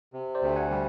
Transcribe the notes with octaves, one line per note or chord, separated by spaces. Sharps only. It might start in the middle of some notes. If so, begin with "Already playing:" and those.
C3
C5 D5
D2
F#5 G#5
G3